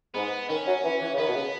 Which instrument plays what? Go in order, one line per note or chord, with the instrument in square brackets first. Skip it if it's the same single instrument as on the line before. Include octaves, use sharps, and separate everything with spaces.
[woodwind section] G#2 [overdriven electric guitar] B3
[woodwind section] D#3 [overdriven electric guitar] C#4
[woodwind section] F#3
E3
E3
C#3
[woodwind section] D#3 [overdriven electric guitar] B3
[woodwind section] B2
C#3